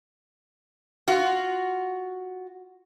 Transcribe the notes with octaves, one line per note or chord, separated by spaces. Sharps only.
F4 F#4